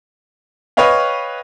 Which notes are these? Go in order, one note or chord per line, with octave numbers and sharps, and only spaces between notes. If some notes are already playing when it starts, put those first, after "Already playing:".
B4 C#5 D#5 F5 G5